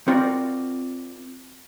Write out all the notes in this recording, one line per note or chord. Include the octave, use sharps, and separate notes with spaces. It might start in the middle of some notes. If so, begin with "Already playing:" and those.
C4 F4 F#4 A#4 D5